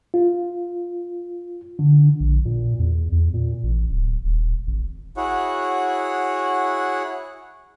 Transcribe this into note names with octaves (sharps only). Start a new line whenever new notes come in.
F4
D3
A#1
A#2
E2
E2
A#2
A1
D1
D#1
G#1
E4 F#4 G#4 C#5 F#5